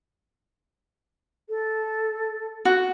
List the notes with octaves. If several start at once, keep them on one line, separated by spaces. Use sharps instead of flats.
A4
F#4